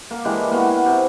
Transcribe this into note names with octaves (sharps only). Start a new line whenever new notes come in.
A#3 A#4
E3 G#3 D4 G4
A#3 B3 F#4
C3